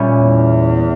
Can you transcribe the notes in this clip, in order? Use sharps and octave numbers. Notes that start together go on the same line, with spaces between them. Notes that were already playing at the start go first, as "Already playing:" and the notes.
Already playing: A#2 G3 C#4 E4
E2